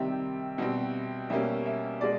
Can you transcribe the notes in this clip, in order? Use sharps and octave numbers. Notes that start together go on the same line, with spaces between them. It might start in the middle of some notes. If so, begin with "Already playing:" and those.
Already playing: C3 D#3 G3 C4 E5
B2 G3 C4
B2 G3 A#3 C#4 E5
E5
B2 G#3 D5